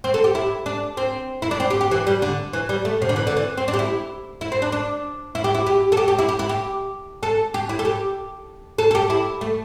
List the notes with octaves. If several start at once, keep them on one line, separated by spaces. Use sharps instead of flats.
C4
A4
G4
E4
D4
C4
E4
D4
C4
G4
G4
E3
G3
D3
E3
G3
A3
C3
D3
E3
D3
E3
C4
D4
G4
E4
E4
C4
D4
D4
E4
G4
E4
G4
A4
G4
G4
E4
G4
E4
G4
A4
G4
E4
A4
G4
A4
A4
G4
E4
A3